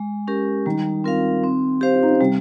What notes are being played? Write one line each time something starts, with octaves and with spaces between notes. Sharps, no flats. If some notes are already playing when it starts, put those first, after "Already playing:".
Already playing: G#3
C#4 G4 A#4
D#3 G3 D#4
C4 F4 A#4 F5
C4
G4 C5 F5
F4
D#4
C#4
C3 G3 C4